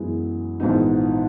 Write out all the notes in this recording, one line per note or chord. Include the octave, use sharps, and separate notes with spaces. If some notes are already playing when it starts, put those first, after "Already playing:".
Already playing: F#2 E3 G#3 B3 E4
A#1 G#2 E3 B3 D#4